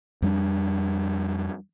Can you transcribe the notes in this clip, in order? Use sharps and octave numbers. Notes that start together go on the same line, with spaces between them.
F2 G3 D4